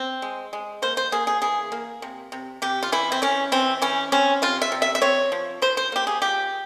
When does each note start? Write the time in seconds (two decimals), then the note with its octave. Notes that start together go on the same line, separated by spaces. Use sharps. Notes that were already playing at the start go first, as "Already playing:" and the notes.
Already playing: C4
0.22 G#3
0.53 G#3
0.82 A#3 C5
0.97 C5
1.12 A#3 G#4
1.27 G#4
1.42 E3 G#4
1.72 A#3
2.02 C3
2.32 C3
2.62 C3 G4
2.83 F4
2.92 E3 E4
3.12 C4
3.22 E3 C#4
3.52 E3 C4
3.82 E3 C#4
4.12 C4 C#4
4.42 C3 F4
4.62 E5
4.72 C3
4.82 E5
4.95 E5
5.02 C4 C#5
5.32 F3
5.62 F3 C5
5.77 C5
5.92 A#3 G4
6.07 G#4
6.22 F3 G4